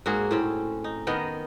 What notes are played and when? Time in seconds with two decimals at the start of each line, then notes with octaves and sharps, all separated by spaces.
0.06 G#2 A#3 F#4 G#4
0.31 A2 C4 C#4
0.84 D#4
1.07 D#3 B3 A#4 D#5